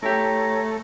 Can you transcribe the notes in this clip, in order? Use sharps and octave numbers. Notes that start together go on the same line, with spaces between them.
A3 E4 G4 C#5 A#5